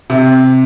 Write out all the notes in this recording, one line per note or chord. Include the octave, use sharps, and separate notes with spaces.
C3